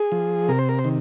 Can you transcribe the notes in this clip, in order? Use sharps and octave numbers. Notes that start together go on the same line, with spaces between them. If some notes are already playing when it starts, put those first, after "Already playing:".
Already playing: G#4
F3
C3 A#4
C5
A#4
C5
D#3